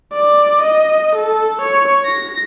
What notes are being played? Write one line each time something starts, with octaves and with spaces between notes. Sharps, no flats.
D5
D#5
A4
C#5
A#6